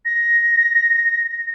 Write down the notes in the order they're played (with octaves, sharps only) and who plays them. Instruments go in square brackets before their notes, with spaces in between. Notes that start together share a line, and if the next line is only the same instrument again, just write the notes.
[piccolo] A#6